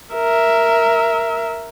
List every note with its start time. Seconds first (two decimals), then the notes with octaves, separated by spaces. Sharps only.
0.13 A#4 E5